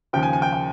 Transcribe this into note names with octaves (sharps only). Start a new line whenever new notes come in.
D#2 C#3 F3 G5
G#5
G#5
G5
G5